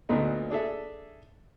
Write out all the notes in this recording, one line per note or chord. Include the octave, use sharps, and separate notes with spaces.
D2 A#2 A3 B3 D#4
D4 G#4 A4 E5